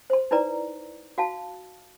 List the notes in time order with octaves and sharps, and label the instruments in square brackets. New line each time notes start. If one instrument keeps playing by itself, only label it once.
[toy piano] C5 C6
D#4 E4 B4 D5 A#5
F#4 F5 A5